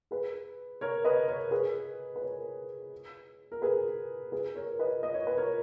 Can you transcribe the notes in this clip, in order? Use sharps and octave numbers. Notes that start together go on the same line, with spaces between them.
G#4 B4
A#4 C#5
B4 D#5
A#4 C#5
G#4 B4
B4
A#4 C#5
A#4
G#4 B4
G#4 B4
A#4 C#5
B4 D#5
D#5
C#5
B4
A#4 C#5